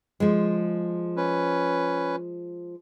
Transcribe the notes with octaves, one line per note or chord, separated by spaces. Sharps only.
F3 G#3
C#4 B4